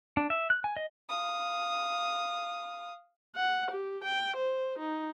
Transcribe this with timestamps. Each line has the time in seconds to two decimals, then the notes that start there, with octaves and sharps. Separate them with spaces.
0.17 D4
0.30 E5
0.50 F#6
0.64 G#5
0.77 D#5
1.09 F5 D#6
3.36 F#5
3.71 G4
4.04 G5
4.37 C5
4.79 D#4